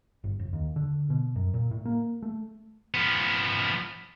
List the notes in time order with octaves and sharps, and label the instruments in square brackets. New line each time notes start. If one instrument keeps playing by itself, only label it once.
[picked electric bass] G1
F1
D#2
D3
B2
F#2
A#2
A2
A#3
A3
[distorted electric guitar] F3 B3